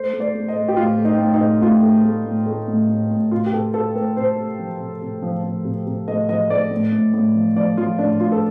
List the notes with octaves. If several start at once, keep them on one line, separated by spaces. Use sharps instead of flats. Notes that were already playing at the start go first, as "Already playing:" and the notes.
Already playing: A3 C5
A3
D5
A3
D#5
A3
G4
A2 F4
A3
D#4
A2
D#4
A3
A2 F4
A3
A3
A2
A3
A2
A2
A2
C3 F4
G4
C3 A4
C3 A4
A3 A#4
C3 C5
A3
F3
C3
C3
F3
F3
C3
C3
A3 D#5
F3 D#5
A3 D5
A2
A2
A2
F3
F3 D5
F3 F4
A2 D4
A2 F4
A4